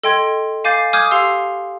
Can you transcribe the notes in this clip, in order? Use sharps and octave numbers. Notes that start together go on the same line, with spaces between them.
A4 D#5 G5 C6 G#6
F5 G#5 D6 G6 A6 C7
G#5 D6 D#6 F6 G6 G#6
G4 F5 C6 E6 C7